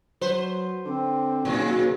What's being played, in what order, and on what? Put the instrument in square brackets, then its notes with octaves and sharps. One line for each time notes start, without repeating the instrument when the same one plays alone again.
[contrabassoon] F#3 [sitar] B4 C5
[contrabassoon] D3 [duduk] C4
[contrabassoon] D#2 [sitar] A#2 C#3 F#3 [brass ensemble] F#4 G#4